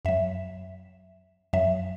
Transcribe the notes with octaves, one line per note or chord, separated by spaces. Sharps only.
F#2 F#3 E5
F#2 F#3 E5